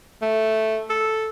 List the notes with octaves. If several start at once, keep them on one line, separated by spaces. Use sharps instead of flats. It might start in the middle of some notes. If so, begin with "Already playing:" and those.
A3
A4